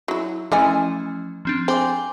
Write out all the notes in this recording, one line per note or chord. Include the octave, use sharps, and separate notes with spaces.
F#3 E4
E3 F3 A3 C#4 D#5 G#5
F3 C4 D4
C4 C5 G#5 D6